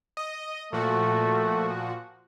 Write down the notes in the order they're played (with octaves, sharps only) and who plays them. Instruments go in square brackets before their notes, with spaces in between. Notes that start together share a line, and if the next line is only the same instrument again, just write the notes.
[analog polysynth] D#5
[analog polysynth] A#2 F3 F#4 [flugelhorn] A3